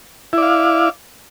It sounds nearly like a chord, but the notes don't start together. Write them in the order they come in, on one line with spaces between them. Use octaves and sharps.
E4 D5 F5